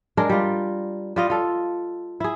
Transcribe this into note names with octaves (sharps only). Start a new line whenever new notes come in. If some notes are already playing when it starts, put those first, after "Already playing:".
G#3 D4 A#4
G3 F4
G3 F4 D#5
F4 A4
E4 G#4